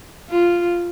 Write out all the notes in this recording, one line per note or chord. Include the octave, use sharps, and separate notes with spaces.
F4